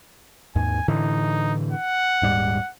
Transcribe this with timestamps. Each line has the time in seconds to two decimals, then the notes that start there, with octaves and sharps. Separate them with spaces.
0.56 D#2 G#2 G#5
0.88 A2 D3 E3 D#4
1.71 F#5
2.22 D#1 G#2 G3